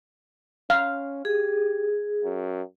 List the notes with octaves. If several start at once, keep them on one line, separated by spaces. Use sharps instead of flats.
C#4 F5
G4 G#4
F#2